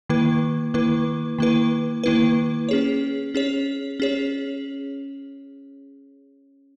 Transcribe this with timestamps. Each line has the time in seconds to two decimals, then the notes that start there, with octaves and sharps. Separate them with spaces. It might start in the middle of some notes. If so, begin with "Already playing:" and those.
0.09 D#3 A#3 E4 B4
0.74 D#3 A#3 E4 B4
1.39 D#3 A#3 E4 B4
2.04 D#3 A#3 E4 B4
2.69 C#4 G#4 C#5
3.35 C#4 G#4 C#5
4.00 C#4 G#4 C#5